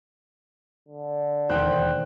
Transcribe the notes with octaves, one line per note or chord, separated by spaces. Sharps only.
D3
E1 D#2 C5 G5 F#6